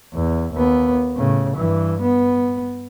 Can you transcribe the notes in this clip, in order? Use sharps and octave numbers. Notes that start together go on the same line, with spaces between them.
E2
D#2 B3
A2 C#3
G2 E3
B3